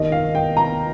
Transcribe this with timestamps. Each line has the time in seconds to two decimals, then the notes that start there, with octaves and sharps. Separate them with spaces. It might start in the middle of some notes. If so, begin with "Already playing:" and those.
Already playing: D#2 D#3 D#5
0.12 F5
0.35 G5
0.57 A#5